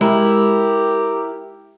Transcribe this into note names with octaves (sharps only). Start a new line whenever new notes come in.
G#3 E4 G4 A#4